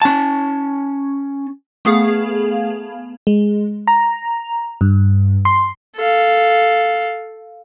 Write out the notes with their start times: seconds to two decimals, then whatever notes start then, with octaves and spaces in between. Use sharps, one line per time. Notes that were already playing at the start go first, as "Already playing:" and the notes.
0.02 C#4 A5
1.85 A3 B3 G#4 F5
3.27 G#3
3.87 A#5
4.81 G2
5.45 C6
5.96 A4 F5